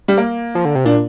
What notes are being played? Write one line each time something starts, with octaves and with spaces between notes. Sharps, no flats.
G3
A#3
F3
D3
C3
A#2 D4